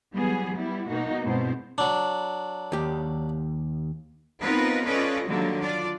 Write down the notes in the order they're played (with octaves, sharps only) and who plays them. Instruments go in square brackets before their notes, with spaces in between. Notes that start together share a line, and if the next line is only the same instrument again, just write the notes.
[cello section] E3 F#3 G3 B3 G#4
G3 B3 E4
B2 A#3 D#4 F#4
G2 B2 G#3 C4 E4 C5
[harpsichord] F#3 D4
[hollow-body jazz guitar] D#2 G4
[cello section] B3 C4 D#4 F4 A#4 B4
C#4 F4 A4 B4 D5 D#5
D3 D#3 F#3 G3 A#3
D4 F4 D5